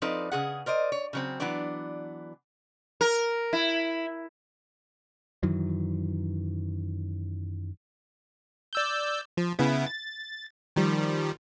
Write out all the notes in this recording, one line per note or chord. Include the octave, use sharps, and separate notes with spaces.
F3 C4 D#4 A4 B4 D5
C#3 G#4 F#5
A#4 C5 D5 D#5
C#5
C#3 F#3 C4
E3 F#3 B3 D4 D5
A#4
E4
F#2 D#3 E3 F#3
D5 E6 G6
F3
C#3 B3 E4
A6
D#3 F3 G3